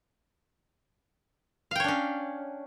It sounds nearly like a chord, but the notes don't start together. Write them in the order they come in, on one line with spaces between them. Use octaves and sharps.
F5 G5 C#5 D4 C#4